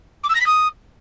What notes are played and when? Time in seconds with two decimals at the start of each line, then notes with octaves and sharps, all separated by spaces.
0.23 D6
0.29 E6
0.35 A#6
0.40 B6
0.46 D#6